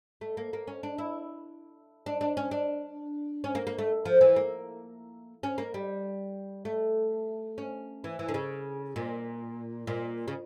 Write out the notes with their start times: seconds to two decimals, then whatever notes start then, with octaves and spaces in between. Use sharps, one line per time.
0.21 A3
0.37 A#3
0.53 A#3
0.68 C#4
0.83 D4
0.98 E4
2.06 D4
2.21 D4
2.37 C#4
2.51 D4
3.44 C#4
3.55 A#3
3.67 A#3
3.79 A3
4.05 F3
4.21 E3
4.36 A#3
5.43 C#4
5.58 A#3
5.74 G3
6.65 A3
7.58 C#4
8.04 E3
8.19 E3
8.28 D3
8.34 C#3
8.96 A#2
9.87 A#2
10.28 C#3